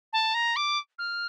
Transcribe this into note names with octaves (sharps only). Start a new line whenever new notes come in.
A5
A#5
D6
F6